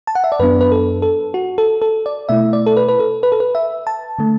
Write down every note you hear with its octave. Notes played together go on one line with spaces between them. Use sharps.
A5
F#5
E5
D5
F#2 F#3 B3 D4 B4
B4
A4
A4
F#4
A4
A4
D5
B2 A3 E4 E5
D5
A4
B4
B4
A4
B4
A4
B4
E5
A5
D3 A3